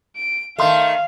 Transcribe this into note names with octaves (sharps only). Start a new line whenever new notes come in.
D7
D#3 A3 E5 F5 C6